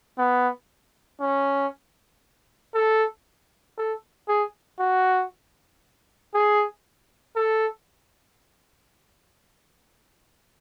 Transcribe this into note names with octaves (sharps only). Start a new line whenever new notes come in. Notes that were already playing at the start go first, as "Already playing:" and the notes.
B3
C#4
A4
A4
G#4
F#4
G#4
A4